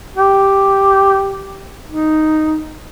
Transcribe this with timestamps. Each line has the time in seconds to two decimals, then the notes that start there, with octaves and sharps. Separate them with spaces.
0.16 G4
1.88 D#4